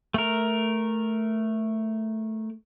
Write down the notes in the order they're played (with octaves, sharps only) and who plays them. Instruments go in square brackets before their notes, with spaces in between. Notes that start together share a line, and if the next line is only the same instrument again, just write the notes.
[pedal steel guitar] A3 A#4